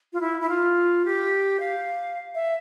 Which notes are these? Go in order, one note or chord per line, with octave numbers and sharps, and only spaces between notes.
F4
E4
E4
F4
G4
F5
E5